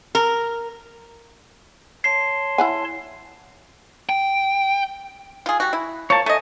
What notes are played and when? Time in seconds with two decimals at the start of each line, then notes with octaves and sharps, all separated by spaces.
0.15 A#4
2.04 C#5 A5 C6 C7
2.58 E4 F#5 G#5
4.09 G5
5.46 F4 G#4
5.60 G3 F#4
5.73 E4
6.10 F3 A#3 C#5 A5
6.26 A3 D#5 G#5